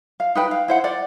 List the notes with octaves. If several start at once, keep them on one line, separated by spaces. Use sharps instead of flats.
F5
D#4 B4 G5
F5
E4 C5 F#5
D5 F#5